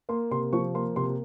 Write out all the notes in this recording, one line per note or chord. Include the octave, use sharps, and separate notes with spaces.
A#3 C6
C3 C6
F3 C#6
A#3 C6
C3 C6